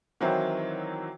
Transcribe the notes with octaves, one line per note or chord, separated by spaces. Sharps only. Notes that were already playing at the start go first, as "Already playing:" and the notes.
D#3 E3 F#3 C4 E4 C5